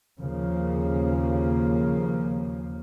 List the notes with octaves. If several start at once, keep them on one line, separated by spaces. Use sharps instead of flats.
D#2 C#3 F3 A#3